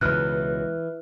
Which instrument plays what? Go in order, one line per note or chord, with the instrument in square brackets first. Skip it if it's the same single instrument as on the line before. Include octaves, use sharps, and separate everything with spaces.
[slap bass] C#2 B2 [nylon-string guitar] E3 [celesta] F6 F#6